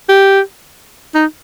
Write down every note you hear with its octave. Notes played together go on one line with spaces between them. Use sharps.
G4
D#4